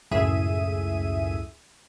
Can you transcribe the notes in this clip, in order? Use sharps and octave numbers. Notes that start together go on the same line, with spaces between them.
C#2 F#2 A2 G#4 E5 D#7